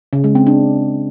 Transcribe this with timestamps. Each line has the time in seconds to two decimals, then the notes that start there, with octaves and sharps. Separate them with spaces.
0.13 C#3
0.24 G#3
0.35 C4
0.47 D4